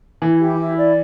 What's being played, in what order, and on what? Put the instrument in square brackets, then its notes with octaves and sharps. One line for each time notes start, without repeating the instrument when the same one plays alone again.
[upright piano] E3 [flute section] E4
[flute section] G4
E4
D5